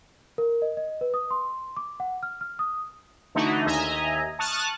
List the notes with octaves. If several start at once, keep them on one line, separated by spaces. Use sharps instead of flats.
A#4
D#5
D#5
B4
D#6
C6
D6
F#5
F6
F6
D#6
D3 E3 A3 D#4 E4 F#4
D#2 D#5 E5 G#5 A#5
A5 C#6 D#6 F6 F#6 A6